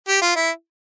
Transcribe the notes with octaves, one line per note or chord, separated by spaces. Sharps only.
G4
F4
E4